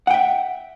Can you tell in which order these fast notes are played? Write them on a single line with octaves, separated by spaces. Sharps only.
F#5 G5 E5